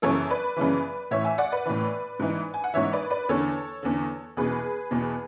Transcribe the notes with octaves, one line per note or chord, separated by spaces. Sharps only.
F#2 C#3 E3 A4 C#5
B4 D5
F#2 C#3 E3
A2 E3 C#5 E5
E5 G#5
D5 F#5
B4 D5
A2 E3
G#2 E3
G#5
F#5
G#2 E3 C#5 E5
B4 D5
B4 D5
E2 D3 A4 C#5
E2 D3
E2 B2 G#4 B4
E2 B2